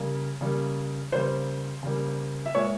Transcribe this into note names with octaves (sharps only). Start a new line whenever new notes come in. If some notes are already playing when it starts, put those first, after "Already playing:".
Already playing: C#3 G3 A#3
C#3 G3 A#3
C#3 G3 A#3 C5
C#3 G3 A#3
E5
A#2 G#3 C#5